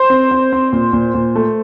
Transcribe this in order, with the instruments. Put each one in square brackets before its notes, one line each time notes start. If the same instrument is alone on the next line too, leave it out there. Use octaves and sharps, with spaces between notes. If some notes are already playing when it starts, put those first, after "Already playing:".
Already playing: [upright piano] C5
[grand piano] C4
C4
C4
A#2
A#2
A#2
A3